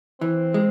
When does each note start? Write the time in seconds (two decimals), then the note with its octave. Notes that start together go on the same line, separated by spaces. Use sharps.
0.21 E3 C4
0.54 G#3